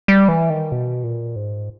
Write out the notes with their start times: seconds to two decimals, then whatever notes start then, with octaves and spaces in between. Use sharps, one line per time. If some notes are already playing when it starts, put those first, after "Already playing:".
0.08 G3
0.28 E3
0.50 D#3
0.72 B2
1.04 A#2
1.36 G#2